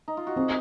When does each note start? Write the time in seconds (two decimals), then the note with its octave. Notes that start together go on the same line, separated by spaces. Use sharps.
0.08 D#4
0.17 F4
0.27 F#4
0.36 C4 G#4